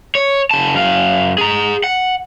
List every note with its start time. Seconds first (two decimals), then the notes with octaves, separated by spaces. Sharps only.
0.15 C#5
0.51 C#3 A5
0.75 F#2 F5
1.38 G#4 A#5
1.84 F#5